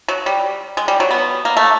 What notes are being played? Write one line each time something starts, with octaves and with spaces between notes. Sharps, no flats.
F#3
G3
G#3
G3
F#3
B3
A#3
A3